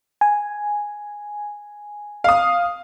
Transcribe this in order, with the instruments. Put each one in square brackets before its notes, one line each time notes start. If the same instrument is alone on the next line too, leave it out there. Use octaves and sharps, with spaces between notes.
[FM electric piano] G#5
[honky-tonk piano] F5 D#6